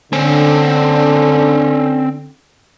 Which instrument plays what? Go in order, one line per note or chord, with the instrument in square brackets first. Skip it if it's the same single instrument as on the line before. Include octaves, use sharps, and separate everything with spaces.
[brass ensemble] D3 [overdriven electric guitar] C4 C#4